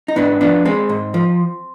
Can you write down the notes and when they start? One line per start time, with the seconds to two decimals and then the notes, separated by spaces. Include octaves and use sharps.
0.08 D#4
0.16 G#2 B3 D4
0.41 F3 B3 D4
0.65 G#3 C4
0.89 G#2
1.14 F3